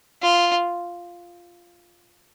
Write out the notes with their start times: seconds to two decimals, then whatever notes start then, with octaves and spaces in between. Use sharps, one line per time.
0.22 F4